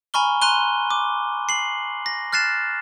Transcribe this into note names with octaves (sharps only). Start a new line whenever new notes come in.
G#5 A#5 B5 C#6 F6 G7
A#5 C6 F#6 D#7 G7
D6
C7 F#7
A#6
F6 F#6 A6 C7 E7